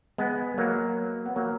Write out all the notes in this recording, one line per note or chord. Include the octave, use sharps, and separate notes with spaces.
G#3 B3
F#3 A#3
B3
F#3 A#3